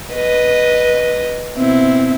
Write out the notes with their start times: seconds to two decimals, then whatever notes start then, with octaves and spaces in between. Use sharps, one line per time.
0.14 B4 D#5
1.56 B2 C4 E4